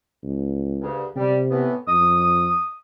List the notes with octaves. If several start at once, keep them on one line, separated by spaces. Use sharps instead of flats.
C#2
D2 G2 C#3
C3 G3
A2 E3 B3
F2 D#6